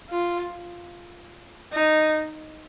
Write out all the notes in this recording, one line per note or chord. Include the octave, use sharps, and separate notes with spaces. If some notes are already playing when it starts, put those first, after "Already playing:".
F4
D#4